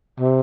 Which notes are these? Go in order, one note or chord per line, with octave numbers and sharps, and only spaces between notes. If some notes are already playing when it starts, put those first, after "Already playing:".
C3